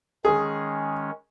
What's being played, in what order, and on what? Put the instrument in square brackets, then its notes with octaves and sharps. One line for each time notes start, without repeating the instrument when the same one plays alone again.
[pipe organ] D#3 G#3 C#4 [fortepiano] G#4